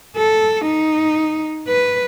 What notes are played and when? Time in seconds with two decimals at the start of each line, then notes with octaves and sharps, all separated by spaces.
0.17 A4
0.66 D#4
1.68 B4